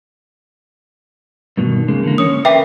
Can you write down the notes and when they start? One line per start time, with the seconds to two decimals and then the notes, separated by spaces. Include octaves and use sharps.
1.57 G2 B2 D#3
1.88 C#3 G#3 A#3
2.03 D3 E3 A#3
2.18 C#4 C#5 D#6
2.45 A#4 B4 E5 G5 D6